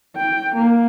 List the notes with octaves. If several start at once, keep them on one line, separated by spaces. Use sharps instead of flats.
G5
A#3